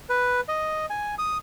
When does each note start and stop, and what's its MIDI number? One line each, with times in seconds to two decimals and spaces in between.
0.09 0.41 71
0.48 0.86 75
0.90 1.15 80
1.18 1.38 87